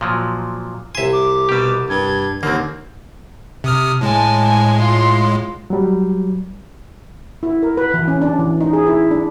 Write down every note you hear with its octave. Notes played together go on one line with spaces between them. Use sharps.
A#2 F3 F#3
C2 E5 G#5 C6
D6
B2 G3 G4
G2 G#6
D#2 D3 A#3 C4
C3 D#6 F6
A2 G#3 G#5 A5
G#5
F4 C6
F#3 G3
E4
A#4
B4
E3
C#4
D4
E3
D#4
G#4
E4
D4